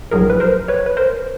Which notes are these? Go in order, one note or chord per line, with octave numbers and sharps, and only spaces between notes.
A#1 A2 F#3 G#4 A#4
B4
A#4 C5
B4 C#5
B4
A#4 C5